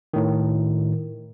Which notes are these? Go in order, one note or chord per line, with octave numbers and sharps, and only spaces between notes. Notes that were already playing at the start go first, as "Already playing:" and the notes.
A2 D#3